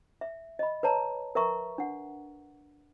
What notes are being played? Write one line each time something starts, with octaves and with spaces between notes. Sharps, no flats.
E5
D#5 B5
B4 C#5 A5 A#5
A#4 B4 E5 A#5 C#6
D4 F#5